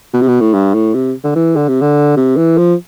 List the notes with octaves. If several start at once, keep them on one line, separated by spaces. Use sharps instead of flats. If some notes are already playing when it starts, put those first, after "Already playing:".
B2
C3
B2
A2
G2
A2
C3
D3
E3
D3
C3
D3
C3
E3
F3